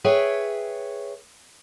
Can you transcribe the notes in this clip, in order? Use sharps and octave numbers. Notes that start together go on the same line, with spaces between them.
G#4 B4 C#5 E5 G5